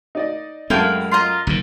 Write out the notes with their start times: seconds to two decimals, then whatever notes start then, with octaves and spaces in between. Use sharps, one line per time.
0.15 D#4 D5 D#5
0.70 F#2 G#3 A3 E4 F5 G5 A5
1.11 F4 D#5 A#5 C6
1.47 F#1 F#2 D#3